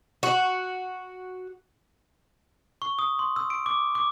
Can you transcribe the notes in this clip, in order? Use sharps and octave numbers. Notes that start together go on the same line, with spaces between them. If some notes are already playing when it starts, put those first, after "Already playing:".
F#4
C#6
D#6
C6
E6
D7
D6
D6